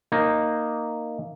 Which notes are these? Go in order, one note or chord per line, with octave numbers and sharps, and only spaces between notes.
A#3 D#4